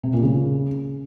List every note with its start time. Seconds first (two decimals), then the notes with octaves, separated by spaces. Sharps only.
0.03 C3
0.13 A#2
0.23 C#3